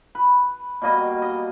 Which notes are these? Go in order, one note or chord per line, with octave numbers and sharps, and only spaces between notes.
B4
B2 G3 A#3 D#5
D#5